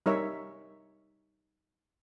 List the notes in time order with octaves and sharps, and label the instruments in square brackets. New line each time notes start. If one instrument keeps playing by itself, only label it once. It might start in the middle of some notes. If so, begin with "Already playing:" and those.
[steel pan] G3 D#4 A#4 C#5 E5